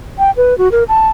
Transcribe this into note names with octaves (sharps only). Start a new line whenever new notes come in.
G5
B4
F#4
A#4
A5